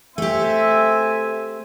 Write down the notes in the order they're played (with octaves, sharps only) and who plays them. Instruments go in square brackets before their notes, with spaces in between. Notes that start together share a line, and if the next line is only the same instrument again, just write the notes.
[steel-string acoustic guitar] A3 G4 [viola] C4 G#5 [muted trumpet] E5